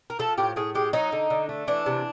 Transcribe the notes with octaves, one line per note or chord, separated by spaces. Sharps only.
A#4
F3 A4
A2 G4
A2 G#4
G#3 G4
F#3 D#4
D3
D3
A3
E3 D4
C3